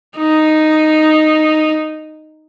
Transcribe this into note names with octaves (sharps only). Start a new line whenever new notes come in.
D#4